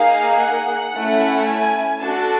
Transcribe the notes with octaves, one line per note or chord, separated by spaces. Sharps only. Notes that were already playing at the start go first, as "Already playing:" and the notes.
Already playing: A#3 D#4 G#4 F5
F#5
A3 C#4 E4
G#5
D4 F#4 A4 A5